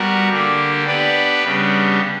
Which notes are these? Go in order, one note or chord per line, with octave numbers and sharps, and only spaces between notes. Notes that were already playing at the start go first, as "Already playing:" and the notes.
Already playing: G3 B3 F#4 A#4
D3 A#3 D4 G4
B3 D4 G4 B4 D5
C#3 G3 B3 D4